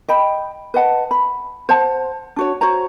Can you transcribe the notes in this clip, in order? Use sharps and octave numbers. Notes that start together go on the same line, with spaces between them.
D#5 G5 B5
B4 D#5 F#5 A5
B5
C5 F#5 A5
D4 F#4 C#5
F#4 C5 C#5 A#5